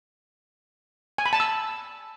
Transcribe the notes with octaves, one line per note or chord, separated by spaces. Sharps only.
G#5
B5
A5
E6